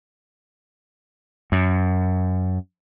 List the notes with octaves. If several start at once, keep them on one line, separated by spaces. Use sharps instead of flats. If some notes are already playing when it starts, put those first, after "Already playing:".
F#2